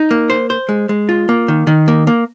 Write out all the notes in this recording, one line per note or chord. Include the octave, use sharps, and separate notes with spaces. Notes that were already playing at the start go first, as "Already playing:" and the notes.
Already playing: D#4
A#3
C5
C5
G#3
G#3
F4
A#3
D#3
D#3
A#3
A#3